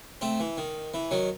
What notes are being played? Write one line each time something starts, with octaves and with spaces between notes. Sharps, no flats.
A3 C4
E3
D#3
E3
D#3 F#3